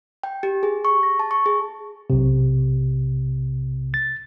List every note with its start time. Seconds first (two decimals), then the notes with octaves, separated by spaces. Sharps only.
0.23 G5
0.43 G4
0.63 G#4
0.85 C#6
1.03 A#6
1.19 A5
1.31 C#6
1.46 G#4
2.10 B1 C3
3.94 A6